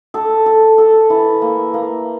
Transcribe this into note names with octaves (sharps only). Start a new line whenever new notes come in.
A4
A4
A4
E3
A#3
A#3